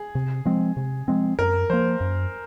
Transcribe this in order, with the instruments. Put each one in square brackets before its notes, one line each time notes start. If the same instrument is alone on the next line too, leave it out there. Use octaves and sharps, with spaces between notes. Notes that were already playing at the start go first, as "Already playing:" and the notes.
Already playing: [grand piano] G#4
[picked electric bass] C3
F3 G#3 C4
C3
F3 G#3 C4
[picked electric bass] F#2 [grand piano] A#4
[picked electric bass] F3 A#3 [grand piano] C5
[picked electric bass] F#2